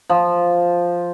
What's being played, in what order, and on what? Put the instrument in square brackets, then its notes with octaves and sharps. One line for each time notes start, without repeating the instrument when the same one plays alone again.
[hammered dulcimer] F3